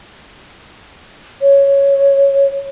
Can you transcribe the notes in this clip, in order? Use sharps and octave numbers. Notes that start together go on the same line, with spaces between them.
C#5